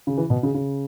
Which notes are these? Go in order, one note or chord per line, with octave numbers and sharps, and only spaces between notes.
C#3
E3
B2
C#3
C#3